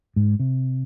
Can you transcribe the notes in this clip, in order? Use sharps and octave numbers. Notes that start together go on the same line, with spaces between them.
G#2
C3